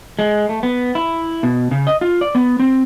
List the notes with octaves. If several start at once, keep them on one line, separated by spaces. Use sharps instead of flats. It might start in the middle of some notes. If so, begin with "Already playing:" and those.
G#3
A3
B3
E4
B2
C#3
D#5
F4
D5
B3
C4